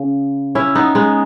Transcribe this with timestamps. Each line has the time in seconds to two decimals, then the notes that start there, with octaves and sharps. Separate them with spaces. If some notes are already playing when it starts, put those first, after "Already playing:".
Already playing: C#3
0.55 C#4 E4
0.75 B3 D#4
0.95 G#3 B3